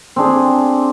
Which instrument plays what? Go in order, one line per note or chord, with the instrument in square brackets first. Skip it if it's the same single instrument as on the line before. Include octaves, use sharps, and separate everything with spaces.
[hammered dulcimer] C4 D4 G#4